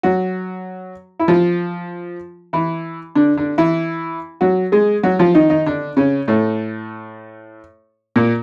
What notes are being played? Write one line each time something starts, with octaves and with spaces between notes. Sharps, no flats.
F#3 F#4
E4
F3 F4
E3 E4
D3 D4
D3 D4
E3 E4
F#3 F#4
G#3 G#4
F#3 F#4
F3 F4
D#3 D#4
D#3 D#4
D3 D4
C#3 C#4
A2 A3
A#2 A#3